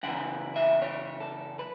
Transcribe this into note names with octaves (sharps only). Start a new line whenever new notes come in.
F#2 C#3 E3 F#5
E5
C#5
A4
B4